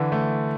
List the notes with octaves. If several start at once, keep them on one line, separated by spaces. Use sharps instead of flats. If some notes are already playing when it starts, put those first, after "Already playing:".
Already playing: D3 E3
A3